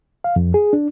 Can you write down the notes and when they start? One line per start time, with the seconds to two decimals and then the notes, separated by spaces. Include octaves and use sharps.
0.24 F5
0.36 F2
0.54 G#4
0.73 D4